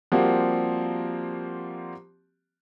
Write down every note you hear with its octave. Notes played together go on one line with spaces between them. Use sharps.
F3 G3 A#3 C4 F#4 G4